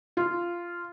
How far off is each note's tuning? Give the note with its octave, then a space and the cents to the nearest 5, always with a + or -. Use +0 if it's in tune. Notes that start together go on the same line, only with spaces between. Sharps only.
F4 -10